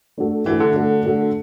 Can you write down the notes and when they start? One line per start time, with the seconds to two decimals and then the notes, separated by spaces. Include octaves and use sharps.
0.18 A3 D4 F#4 A4
0.45 E3 A3 D4 F#4 A4
0.60 D3
0.75 A3 D4 F#4 A4
1.04 A3 D4 F#4 A4